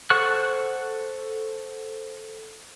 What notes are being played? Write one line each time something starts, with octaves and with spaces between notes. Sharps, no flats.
A4 C5 F#5 C#6 F#6